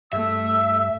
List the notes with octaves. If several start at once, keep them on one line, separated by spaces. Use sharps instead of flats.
G2 A3 E5 E6